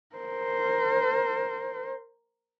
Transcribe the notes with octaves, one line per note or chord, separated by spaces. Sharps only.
A#4 C5